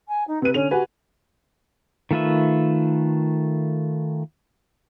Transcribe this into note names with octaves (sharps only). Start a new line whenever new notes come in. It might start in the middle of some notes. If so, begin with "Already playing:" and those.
G#5
D#4
C3 B4 D#7
D3 C#4 F7
F#4 G4 B4 G#5
D#3 A3 F4 B4 E5